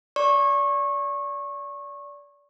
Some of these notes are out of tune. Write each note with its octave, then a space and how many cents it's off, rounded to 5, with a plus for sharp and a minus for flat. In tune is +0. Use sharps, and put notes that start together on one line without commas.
D5 -25 C#6 -25